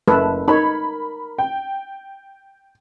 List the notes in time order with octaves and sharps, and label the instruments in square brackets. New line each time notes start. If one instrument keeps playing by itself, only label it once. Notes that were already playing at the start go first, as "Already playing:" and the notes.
[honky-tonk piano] F#1 [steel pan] A3 A4 B4
[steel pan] D#4 C#5 [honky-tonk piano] A#4 B5
[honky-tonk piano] G5